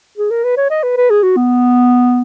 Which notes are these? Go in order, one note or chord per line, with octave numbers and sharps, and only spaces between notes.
G#4
A#4
B4
C#5
D#5
B4
B4
G#4
F#4
B3